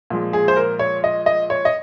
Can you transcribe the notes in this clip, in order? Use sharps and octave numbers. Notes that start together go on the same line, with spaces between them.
A#2 F3 G#3
G#4
C5
A#4
C#5
D#5
D#5
C#5
D#5